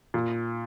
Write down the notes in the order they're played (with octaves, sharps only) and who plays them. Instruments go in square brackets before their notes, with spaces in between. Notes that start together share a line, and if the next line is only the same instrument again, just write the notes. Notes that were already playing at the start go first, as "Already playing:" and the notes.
[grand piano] A#2